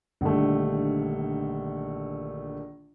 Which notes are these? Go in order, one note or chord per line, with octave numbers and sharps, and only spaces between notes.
A#1 D3 D#3 G3 A3